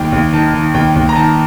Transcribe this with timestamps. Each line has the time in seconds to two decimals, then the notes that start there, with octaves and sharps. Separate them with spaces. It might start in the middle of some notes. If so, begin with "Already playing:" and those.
Already playing: D#2 G5
0.12 D#2
0.33 D#3 A5
0.54 D#3
0.74 D#2 G5
0.95 D#2
1.09 A#5
1.16 D#3 A5